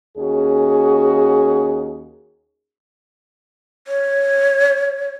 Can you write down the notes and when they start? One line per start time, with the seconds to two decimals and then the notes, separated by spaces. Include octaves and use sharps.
0.18 D#2 C#4 F#4 G#4
3.87 C#5